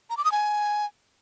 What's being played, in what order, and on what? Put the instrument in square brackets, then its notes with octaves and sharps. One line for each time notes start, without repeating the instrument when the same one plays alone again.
[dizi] A#5
D6
D#6
G#5